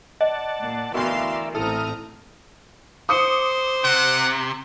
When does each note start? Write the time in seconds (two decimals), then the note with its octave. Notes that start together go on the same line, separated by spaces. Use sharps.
0.21 D5 D#5 F#5 A5
0.61 A#2
0.94 D2 B2 E3 A#4 D5 E5 F5 C6
1.55 A1 C4 E4 A4 A#5 D#6 F6
3.09 C5 D6 D#6 C#7
3.84 C3 F#5